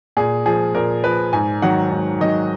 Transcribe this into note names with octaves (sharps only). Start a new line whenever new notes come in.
A#2 G#4
F3 G#4
A#2 A#4
F3 B4
G#2 G#5
D#3 F#3 F#5
G#2
D#3 F#3 D#5